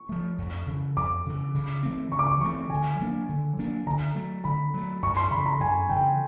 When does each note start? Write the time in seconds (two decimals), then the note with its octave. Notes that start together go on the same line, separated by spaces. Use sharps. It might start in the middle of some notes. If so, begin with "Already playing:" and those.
Already playing: C#6
0.09 F3 A3
0.38 F2
0.67 C#3 E3
0.97 F2 D6
1.26 C#3 E3
1.54 C#3
1.83 E3 A3 C4
2.12 C#3 C#6
2.19 D6
2.27 C#6
2.41 E3 A3 C4 C#6
2.70 D3 G#5
2.99 F#3 A#3 D4
3.29 D3
3.57 F#3 A#3 D4
3.87 D3 A#5
4.15 F#3 A3
4.44 D3 B5
4.74 F#3 A3
5.03 F#2 C#6
5.17 C6
5.31 C#3 E3 B5
5.46 A#5
5.60 F#2 G#5
5.89 C#3 E3 G5